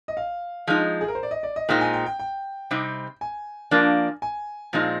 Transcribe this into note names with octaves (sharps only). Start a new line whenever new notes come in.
D#5
F5
F3 G#3 D#4
G#4
A#4
C5
D5
D#5
D5
D#5
A#2 G#3 C4 D#4 G5
G#5
G5
G5
G5
C3 G3 C4 D#4
G#5
F3 A#3 D4
G#5
A#2 F3 G#3 C4 D#4